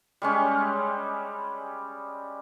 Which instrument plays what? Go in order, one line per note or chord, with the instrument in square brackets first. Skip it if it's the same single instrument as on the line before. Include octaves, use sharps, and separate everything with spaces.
[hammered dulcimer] G3 G#3 C#4